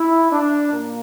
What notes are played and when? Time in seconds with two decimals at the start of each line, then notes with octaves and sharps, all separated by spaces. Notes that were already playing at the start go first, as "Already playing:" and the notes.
Already playing: E4
0.32 D4
0.72 A#2 A#3